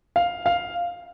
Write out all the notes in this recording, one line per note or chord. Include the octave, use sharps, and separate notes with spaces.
F5
F5